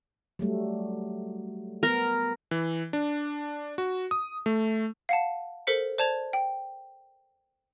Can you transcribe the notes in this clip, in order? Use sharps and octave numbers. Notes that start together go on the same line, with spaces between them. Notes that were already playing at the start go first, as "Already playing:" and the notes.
F#3 G3 A3
B3 A#4
E3
D4
F#4
D#6
A3
F5 F#5 A5
A4 A#4 C5 B6 C#7
C5 D5 A5 G#6 F7
G5